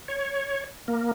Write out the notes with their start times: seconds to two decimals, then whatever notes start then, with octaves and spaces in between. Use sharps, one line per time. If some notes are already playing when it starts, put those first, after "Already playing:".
0.08 C#5
0.88 A#3